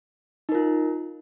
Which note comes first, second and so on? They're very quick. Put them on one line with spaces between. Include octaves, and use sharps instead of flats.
D#4 A#4 F4